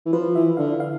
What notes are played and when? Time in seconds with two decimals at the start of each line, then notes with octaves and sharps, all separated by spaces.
0.06 E3
0.13 F3 B4
0.35 E3 E5
0.57 D3 F5
0.80 F5